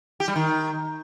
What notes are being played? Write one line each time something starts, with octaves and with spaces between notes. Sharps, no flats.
G4
G3
D#3